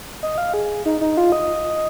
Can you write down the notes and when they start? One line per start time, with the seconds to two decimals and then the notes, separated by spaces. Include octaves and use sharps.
0.23 D#5
0.38 F5
0.54 G#4
0.86 D#4
1.01 D#4
1.17 F4
1.32 D#5